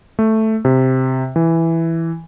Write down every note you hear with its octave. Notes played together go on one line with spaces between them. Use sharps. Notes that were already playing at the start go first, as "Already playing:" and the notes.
A3
C3
E3